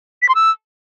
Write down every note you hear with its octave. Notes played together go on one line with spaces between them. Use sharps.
B6
C6
E6